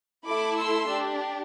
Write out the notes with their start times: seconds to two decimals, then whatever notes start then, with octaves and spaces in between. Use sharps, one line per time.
0.25 A3 E4 A4 B5 D6
0.57 C6 E6
0.89 D4 G4